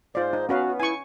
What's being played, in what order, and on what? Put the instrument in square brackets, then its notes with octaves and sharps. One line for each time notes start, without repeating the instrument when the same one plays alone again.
[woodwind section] G#2 [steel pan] F4 D5 [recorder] C5
[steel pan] D#4
[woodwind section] B3 [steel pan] C#4 B4 F5 [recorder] F#4
[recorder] E4 [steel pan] G#5 C#6